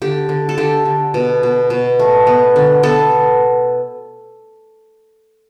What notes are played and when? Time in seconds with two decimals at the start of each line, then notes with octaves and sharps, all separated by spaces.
0.02 D3 G4
0.29 D3
0.49 A4
0.58 D3 G4
0.85 D3
1.14 B2
1.43 B2
1.70 B2
1.99 A3
2.27 B3
2.56 D3
2.83 B3 A4